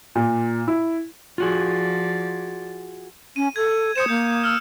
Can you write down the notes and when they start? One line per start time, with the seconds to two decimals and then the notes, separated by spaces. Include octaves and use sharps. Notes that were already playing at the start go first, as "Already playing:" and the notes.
0.15 A#2
0.68 E4
1.38 F3 F4 F#4 G#4 D5
3.36 C#4 D#7
3.56 A4 G#6
3.96 C5 D#6 C#7 E7
4.08 A#3 G6
4.44 E6 F6